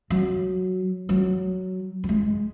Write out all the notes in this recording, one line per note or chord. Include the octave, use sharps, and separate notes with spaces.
F#3
F#3
F#3
G#3